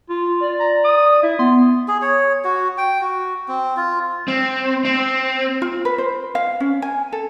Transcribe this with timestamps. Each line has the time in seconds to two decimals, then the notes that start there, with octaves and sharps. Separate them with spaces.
0.10 F4
0.40 D5
0.60 A#5
0.85 D#6
1.23 E4 E5
1.39 B3 C6
1.88 G#4
2.02 C#5
2.44 F#4
2.78 G5
3.01 F#4
3.48 C4
3.77 F4
4.28 C4
4.85 C4
5.62 F4
5.85 B4
5.98 C5
6.35 F5
6.60 C#4
6.82 G#5
7.13 A4